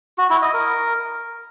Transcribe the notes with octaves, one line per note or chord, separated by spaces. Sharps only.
F#4
E4
D#5
A#4